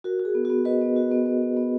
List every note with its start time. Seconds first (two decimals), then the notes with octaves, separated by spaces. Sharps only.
0.04 F#4 A#4
0.19 F#4
0.25 G#4
0.35 B3
0.45 B3 F#4
0.65 F#4 B4 D#5
0.81 B3
0.96 F#4
1.11 B3
1.26 B3
1.42 B3
1.57 B3